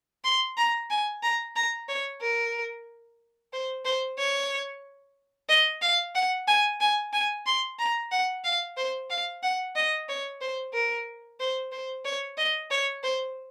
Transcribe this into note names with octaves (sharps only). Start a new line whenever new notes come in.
C6
A#5
G#5
A#5
A#5
C#5
A#4
C5
C5
C#5
D#5
F5
F#5
G#5
G#5
G#5
C6
A#5
F#5
F5
C5
F5
F#5
D#5
C#5
C5
A#4
C5
C5
C#5
D#5
C#5
C5